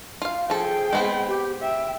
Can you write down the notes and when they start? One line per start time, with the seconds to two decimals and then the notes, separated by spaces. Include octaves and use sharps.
0.22 F4 F5
0.50 F3 G#4 A4 G5
0.93 G#3 B3 C4
1.28 G4
1.62 E5 G5